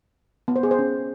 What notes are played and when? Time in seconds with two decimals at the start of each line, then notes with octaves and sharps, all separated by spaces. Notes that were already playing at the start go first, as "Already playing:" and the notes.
0.48 B3
0.56 C5
0.63 G#4
0.71 C5
0.79 C#4